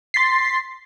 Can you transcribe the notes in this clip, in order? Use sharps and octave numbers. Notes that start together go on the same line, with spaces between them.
C6 A6 B6 C7